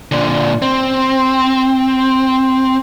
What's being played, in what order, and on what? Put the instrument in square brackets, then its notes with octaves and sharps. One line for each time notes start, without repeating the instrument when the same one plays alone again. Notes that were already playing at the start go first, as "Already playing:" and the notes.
[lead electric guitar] A#2 D3
C4